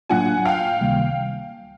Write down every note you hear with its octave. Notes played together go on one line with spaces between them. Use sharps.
A2 F#3 A#3 D4 F4 F#5 G#5
F5 G5
C#2 C3 D#3 G3 A#3